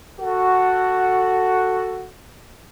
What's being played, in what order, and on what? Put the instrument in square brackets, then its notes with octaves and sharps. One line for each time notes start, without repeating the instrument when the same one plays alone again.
[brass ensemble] F#4 A4